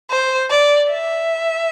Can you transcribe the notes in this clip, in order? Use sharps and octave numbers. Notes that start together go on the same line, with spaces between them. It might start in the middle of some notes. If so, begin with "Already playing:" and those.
C5
D5
E5